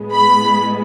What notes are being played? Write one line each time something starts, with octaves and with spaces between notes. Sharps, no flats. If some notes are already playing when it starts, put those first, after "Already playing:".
Already playing: A2 G#3 B3
B5